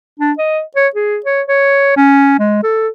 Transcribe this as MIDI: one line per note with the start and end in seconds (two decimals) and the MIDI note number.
0.19 0.32 62
0.38 0.61 75
0.76 0.88 73
0.95 1.18 68
1.26 1.42 73
1.48 1.95 73
1.96 2.39 61
2.39 2.62 56
2.63 2.88 69